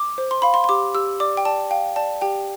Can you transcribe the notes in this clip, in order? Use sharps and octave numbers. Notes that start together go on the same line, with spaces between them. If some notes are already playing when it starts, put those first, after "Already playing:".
Already playing: D6
C5
C6
F5 B5
C6
C6
G4 D6
G4 E6
D5 D6
G5
D5 A5
F5 G5
D5 A5
G4 G5